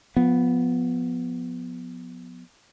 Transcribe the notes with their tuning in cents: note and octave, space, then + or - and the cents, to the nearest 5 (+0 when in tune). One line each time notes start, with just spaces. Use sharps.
F3 +25 B3 +0